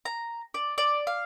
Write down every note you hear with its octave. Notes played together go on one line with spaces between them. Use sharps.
A#5
D5
D5
F5